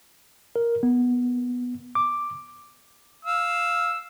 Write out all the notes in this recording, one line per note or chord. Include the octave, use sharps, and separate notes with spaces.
A#4
B3
D6
F5 E6